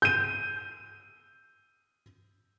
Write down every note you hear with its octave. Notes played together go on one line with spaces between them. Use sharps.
G6 D#7